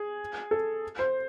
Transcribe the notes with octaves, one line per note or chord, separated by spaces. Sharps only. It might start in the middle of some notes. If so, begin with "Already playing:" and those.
Already playing: G#4
A4
C5